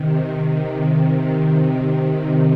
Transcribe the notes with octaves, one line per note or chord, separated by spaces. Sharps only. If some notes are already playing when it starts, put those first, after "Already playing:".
Already playing: C3 D#3
C3 D#3